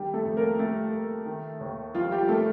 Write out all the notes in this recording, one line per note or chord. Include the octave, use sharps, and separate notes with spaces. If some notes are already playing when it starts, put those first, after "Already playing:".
Already playing: D#3 G3 G4
A3 A4
F2
A#3 A#4
G3 A3 A4
A#3
D#3
D#2
F3 G3 F4
G3 G4
A3 A#3 A4